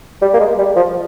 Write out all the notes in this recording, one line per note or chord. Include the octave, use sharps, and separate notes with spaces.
G3
A#3
G#3
G3
F3